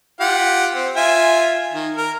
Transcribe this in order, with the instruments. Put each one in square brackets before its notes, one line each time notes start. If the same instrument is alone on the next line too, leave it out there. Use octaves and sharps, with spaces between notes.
[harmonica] F4 G4 F#5
C4
F4 E5 G#5
D#3
A#4